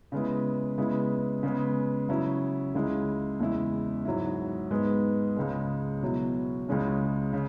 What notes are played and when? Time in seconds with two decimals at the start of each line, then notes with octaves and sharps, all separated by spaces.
0.12 C#3 G#3 B3 E4
0.78 C#3 G#3 B3 E4
1.43 C#3 G#3 B3
2.09 C#3 F#3 C#4 E4
2.75 C#2 C#3 G#3 E4
3.40 E2 C#3 G#3 E4
4.05 G#2 F#3 E4
4.71 G#2 G#3 B3
5.36 C#2 C#3 G#3
6.02 B2 F#3 E4
6.67 C#2 C#3 G#3 C#4 E4
7.33 C#3